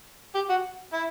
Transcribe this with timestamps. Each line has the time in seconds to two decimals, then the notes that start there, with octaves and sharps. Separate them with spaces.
0.35 G4
0.49 F#4
0.93 E4